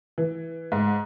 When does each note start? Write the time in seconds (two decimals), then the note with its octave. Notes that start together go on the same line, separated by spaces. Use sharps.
0.18 E3
0.72 G#2